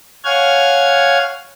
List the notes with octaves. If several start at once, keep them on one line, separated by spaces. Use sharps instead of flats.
C#5 F5 F#5 G#5 F6 G#6